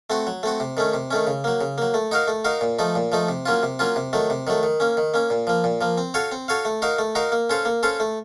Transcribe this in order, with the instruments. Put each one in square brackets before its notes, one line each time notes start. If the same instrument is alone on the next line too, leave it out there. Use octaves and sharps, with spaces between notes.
[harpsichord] A3 C4 F#4
F#3
A3 C4 F#4
C3
D#3 A3 C#4
C3
D#3 A3 C#4
C#3
F#3 A#3
C#3
F#3 A#3
A3
D#4 F#4 A#4 F5
A3
D#4 F#4 A#4 F5
A#2
F3 A3 D#4
A#2
F3 A3 D#4
C3
F#3 A#3 C#4 F4
C3
F#3 A#3 C#4 F4
C3
D#3 F#3 A3
C3
D#3 F#3 A3
D#3
A#3 C#4
D#3
A#3 C#4
A#2
F3 A#3
A#2
F3 A#3
C4
F#4 A4 C#5 F5
C4
F#4 A4 C#5 F5
A3
D#4 F#4 A#4 F5
A3
D#4 F#4 A#4 F5
A#3
C#4 A4 C5 F5
A#3
C#4 A4 C5 F5
A3